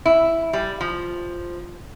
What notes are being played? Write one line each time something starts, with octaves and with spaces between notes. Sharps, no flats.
E4
G3
F3